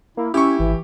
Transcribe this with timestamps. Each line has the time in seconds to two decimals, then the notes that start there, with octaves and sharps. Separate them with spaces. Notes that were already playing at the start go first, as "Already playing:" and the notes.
0.17 A#3 E4
0.34 C#4 E4 G4 C#6
0.59 G#1 E3